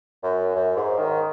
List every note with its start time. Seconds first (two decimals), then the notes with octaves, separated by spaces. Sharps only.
0.23 F#2
0.55 F#2
0.76 G#2
0.98 D#3